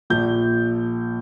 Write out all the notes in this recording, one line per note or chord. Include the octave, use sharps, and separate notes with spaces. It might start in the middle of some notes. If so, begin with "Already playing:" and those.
A#1 A#2 F3 G6